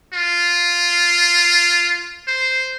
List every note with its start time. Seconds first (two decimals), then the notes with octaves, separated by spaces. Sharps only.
0.13 F4
2.28 C5